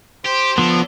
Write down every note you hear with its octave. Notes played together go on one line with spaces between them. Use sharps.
G4 C5
F3 B3 D4 A4